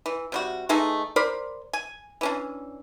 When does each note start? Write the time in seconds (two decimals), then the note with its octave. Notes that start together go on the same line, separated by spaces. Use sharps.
0.06 E3
0.32 C3 G3 F#4
0.69 E3 G#3 A3 D#4
1.16 A#4 C5 D5 B5
1.73 G#5
2.21 E3 C#4 D4